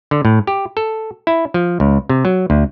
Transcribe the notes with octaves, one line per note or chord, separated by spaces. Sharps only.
D3
A2
G4
A4
E4
F3
C#2
C3
F#3
D2